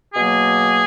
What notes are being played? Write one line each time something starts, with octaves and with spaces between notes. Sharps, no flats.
B2 F#3 A#3 G#4